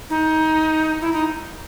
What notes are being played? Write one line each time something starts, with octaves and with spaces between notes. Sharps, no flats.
D#4
E4
D#4